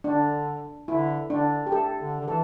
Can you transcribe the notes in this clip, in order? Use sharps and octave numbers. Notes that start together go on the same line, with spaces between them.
D3 D4
D3 E4
D3 D4
G4
A4
D3
D3
E3 A4